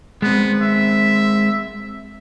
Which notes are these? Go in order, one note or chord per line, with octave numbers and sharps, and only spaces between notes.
G#3 B3 C4
E5